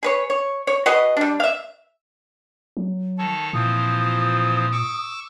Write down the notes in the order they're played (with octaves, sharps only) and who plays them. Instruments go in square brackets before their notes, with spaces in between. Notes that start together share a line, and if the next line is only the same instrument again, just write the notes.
[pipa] G#4 B4 C#5
C#5
C#5
F#4 G#4 B4 D#5
G3 D4
E5 F5
[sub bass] F#3
[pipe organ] D#3 A4 C#5 [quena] A5
[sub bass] A#2 [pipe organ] E3 F3 C4 [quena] D#6
[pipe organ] C#6 D6 E6